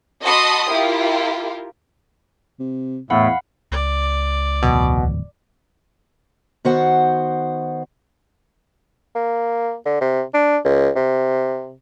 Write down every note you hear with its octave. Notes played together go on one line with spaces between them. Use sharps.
F#4 D#5 A5 B5 C6 D#6
E4 F4 G4 A#4
C3
E2 A2 A3 F5 F#5 B5
C#2 D5
D1 E2 B2 F#3
D#3 B3 F#4 C5 F#5
A#3
D3
C3
D4
C#2
C3